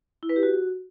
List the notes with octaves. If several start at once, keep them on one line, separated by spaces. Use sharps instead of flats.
E4
B4
G4
F#4